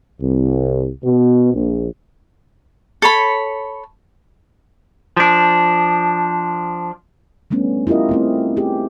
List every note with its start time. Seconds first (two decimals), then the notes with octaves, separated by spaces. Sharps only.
0.21 C2
1.04 B2
1.53 A#1
3.02 A4 C#5 B5
5.17 F3 D4
7.51 G3 A3 B3 C#4 D4
7.87 E4 F4 G4 A#4 D#5
8.09 A3 C4 E4
8.57 G4 G#4